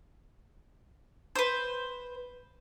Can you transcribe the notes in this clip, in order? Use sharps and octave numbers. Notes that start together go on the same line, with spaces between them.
B4 C5